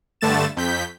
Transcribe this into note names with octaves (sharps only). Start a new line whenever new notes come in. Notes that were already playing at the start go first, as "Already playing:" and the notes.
G2 D3 A3 A6 E7
F2 G6 B6